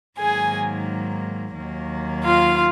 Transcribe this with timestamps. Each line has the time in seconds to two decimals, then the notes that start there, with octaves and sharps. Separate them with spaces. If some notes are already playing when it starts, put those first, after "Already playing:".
0.19 G#2 D#3 F#3 A#3 G#4 G#5
1.55 D#2 D#3 F#3 A#3
2.24 F4 F5